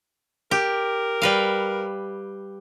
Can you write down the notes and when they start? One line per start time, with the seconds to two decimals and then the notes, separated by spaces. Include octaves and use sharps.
0.51 G4 A#4
1.22 G3 B4 F5